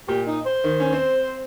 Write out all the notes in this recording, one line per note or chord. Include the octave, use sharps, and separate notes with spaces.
A#2 G4
D#4
C5
D#3
C#4
C4